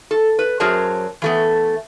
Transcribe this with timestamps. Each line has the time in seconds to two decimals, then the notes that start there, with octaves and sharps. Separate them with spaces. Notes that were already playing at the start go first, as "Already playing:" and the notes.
0.11 A4
0.39 B4
0.60 F#2 F#3 G#4 A#4 C5 A5
1.22 E3 A3 B3